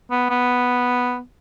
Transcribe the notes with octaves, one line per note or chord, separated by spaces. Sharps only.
B3
B3